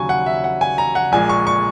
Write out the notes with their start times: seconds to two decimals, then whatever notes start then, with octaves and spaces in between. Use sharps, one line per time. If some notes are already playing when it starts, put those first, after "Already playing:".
Already playing: D#2 C#3 F#3 G#5 C#6
0.09 F#5
0.26 E5
0.44 F#5
0.61 G#5
0.78 A#5
0.95 F#5
1.12 A#1 A#2 G#3 G#5
1.29 C#6
1.47 C#6